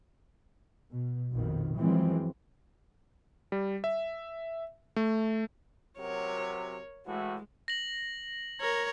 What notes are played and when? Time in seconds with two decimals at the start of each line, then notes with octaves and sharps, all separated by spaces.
0.91 B2
1.34 A#1 F2 B2 D#3
1.76 F#2 E3 F3 G#3 C4
3.52 G3
3.84 E5
4.96 A3
5.98 C3 F#3 A#4 C#5
7.07 A2 E3 G#3 F#4
7.68 A#6 F#7
8.60 A#4 C#5